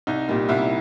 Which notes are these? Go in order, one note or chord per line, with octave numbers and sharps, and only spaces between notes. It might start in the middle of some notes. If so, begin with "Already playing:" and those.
C2 D#4
A#2 G3 A#3
C2 E4